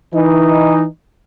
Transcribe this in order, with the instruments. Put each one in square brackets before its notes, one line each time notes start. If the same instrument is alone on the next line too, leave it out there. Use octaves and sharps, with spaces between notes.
[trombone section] E3 D#4